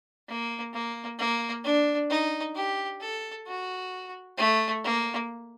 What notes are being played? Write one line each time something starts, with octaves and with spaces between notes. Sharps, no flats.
A#3
A#3
A#3
D4
D#4
G4
A4
F#4
A3
A#3